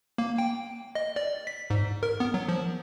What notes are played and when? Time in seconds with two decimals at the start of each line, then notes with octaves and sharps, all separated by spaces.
0.18 A#3
0.38 G5
0.95 D#5
1.16 D5
1.47 B6
1.70 G#2
2.03 A#4
2.20 B3
2.34 F#3
2.49 F3